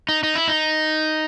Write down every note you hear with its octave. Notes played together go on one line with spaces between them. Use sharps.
D#4
D#4
E4
D#4